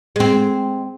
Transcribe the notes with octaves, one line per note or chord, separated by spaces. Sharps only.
G#3 C4